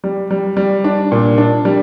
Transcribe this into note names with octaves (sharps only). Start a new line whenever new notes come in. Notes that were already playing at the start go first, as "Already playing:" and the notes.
G3
G3
G3
D4
A#2
D4
G3